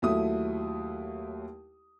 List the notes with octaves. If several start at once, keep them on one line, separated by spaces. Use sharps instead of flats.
D#2 F#3 A3 E4 D#6